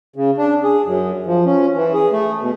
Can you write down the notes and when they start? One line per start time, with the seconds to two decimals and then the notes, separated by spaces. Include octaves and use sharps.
0.16 C#3
0.38 D4
0.64 G#4
0.85 F#2
1.26 F3
1.46 C#4
1.76 E3
1.93 G#4
2.12 A3
2.41 B2